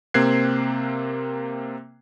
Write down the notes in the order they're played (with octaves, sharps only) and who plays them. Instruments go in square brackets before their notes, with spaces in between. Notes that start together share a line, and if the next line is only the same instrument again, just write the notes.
[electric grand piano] C3 A#3 C4 F#6 G#6 C7